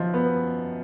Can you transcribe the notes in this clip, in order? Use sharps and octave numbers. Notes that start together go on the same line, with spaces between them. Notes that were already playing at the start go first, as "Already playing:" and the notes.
Already playing: F#2 F3 D#4
B3